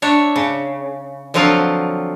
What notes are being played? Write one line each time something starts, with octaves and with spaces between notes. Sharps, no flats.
D4 C#5 E5
C#3
D3 F3 F#3 C4 F4